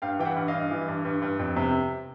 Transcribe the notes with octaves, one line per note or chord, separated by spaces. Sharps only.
G2 F5 G5
E3 G5
E5 F#5
G2
D#5 F5
G2
E3
G2
G2
G2
F2
C3